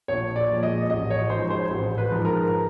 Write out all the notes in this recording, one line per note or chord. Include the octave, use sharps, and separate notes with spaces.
A#1 C#5
D5
A#2 F3 G#3
D#5
A1 D#5
C#5
G#2 F3 G#3 C5
C5
A1 C5
B4
G#2 F3 G#3
A#4